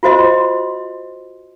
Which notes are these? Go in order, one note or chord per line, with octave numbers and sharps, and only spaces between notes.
F4 F#4 C5 D#5 C6